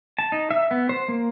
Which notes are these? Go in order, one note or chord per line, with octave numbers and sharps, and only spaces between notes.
A5
D#4
E5
B3
C5
A#3